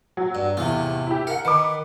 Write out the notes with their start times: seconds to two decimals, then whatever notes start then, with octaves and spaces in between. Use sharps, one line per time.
0.17 F#3
0.35 G2
0.57 E2 A2 C3 F4
1.07 E4 G4
1.27 A#4 F#5 C#7
1.45 D#3 B4 D6